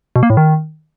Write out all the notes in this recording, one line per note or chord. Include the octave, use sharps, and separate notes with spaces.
B2
A#3
A2
D#3